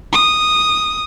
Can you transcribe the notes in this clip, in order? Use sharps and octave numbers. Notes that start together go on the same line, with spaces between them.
D#6